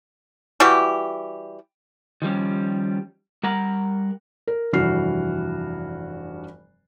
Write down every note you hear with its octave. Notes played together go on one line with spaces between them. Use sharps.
E3 G3 F#4 G4
D#3 F3 G3 C#4
G3 A#4 F#5 A#5
A#4
F1 G2 E3 F#4 F6 C7